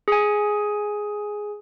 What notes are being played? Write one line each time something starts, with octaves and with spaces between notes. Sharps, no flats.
G#4 G#5